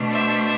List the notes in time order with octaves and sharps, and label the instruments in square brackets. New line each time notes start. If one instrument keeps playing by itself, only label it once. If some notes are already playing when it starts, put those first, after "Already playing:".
Already playing: [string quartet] B2 A3 D4
C5 E5